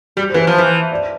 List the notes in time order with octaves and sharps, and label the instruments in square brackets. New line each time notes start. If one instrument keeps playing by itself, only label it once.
[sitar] G3 [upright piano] G4
[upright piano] C5
[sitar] E3 [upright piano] B4
[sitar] F3
[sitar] E3 [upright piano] C5
[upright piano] D5